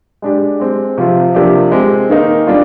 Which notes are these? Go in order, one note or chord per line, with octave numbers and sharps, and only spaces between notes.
G#3 D4 G4
G#3 C4 G4
C3 F3 C4 F4
C3 F3 A#3 D4 G4
G#3 C4 G4
D#3 A#3 D#4
G3 D4 F4